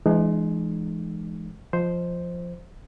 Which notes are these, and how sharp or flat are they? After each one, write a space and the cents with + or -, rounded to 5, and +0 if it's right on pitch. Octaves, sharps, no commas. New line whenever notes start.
E3 +30 G#3 +20 D#4 -40
F3 +0 C5 +0 D#5 +0